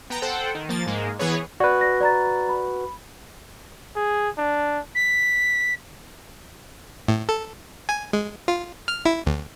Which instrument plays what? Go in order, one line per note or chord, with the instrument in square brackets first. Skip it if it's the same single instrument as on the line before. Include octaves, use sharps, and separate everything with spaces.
[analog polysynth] B3 G5 A#5
A4 C5 F#5 G5
D#3
F3 A#3 A6
G#2 G#3 A#3
E3 B3 G#4 B4 C#5
[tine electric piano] F#4 B4 [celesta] D5
[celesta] A#6
D5 A#5 A6
B5
[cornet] G#4
D4
[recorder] B6
[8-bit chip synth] A2
A4
G#5
G#3
F4
F6
E4
D2